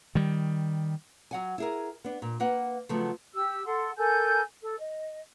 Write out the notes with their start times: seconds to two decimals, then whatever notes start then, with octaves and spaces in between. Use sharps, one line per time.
0.15 D#3 G3
1.31 F#3 F#5 G#5
1.58 E4 G#4 A#4
2.04 B3 D4
2.22 A#2
2.40 A#3 B4 F#5
2.89 C#3 F3 F#3 A3 B3
3.34 G4 E6
3.65 A4 F#5 C6
3.97 A4 A#4 G#5 G6
4.61 A4
4.78 D#5